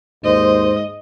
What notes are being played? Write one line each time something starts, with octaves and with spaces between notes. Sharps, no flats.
D#2 G#2 C5 D#5